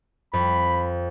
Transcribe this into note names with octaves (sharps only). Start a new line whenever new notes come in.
F2 B5